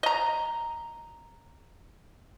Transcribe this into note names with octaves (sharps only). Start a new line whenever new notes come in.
D#5 A#5